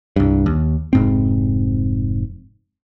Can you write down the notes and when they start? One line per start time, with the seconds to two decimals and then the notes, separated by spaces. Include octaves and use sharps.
0.16 C2 G2
0.46 D#2
0.93 F1 G#2 C4